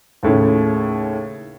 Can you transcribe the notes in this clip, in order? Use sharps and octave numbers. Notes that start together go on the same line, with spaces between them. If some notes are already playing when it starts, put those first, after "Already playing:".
D#2 A2 C#3